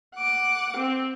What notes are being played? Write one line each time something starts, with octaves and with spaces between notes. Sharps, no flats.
F#5 D6
C4